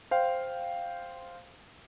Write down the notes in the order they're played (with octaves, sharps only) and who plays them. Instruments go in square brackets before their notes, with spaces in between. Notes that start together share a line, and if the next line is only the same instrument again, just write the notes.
[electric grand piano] C5 F5 G5